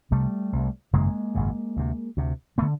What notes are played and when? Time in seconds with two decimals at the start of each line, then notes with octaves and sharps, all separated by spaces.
0.11 C2 C3 G3 A3
0.53 C2 C3
0.93 G#1 F#2 C#3 G#3 A#3
1.35 G#1 F#2 C#3
1.77 D2 C3
2.17 D2 C3
2.58 A3 B3
2.62 D3